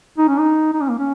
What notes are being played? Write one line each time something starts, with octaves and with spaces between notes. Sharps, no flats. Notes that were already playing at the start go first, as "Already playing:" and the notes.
D#4
C#4
D#4
D#4
C#4
A#3
C#4